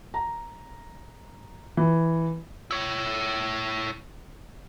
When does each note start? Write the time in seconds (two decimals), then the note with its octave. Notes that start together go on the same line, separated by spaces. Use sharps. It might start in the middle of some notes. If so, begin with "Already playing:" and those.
0.14 A#5
1.77 E3
2.71 E4 C#5